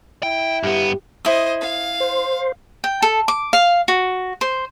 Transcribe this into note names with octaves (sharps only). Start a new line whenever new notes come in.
E4 G5
G2 B3 G4
E4 C5 D#5 D#6
F5
C5
G5
A4
D6
F5
F#4
C5